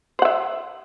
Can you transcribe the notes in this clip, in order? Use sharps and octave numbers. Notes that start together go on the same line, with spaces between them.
C5 E5 F#5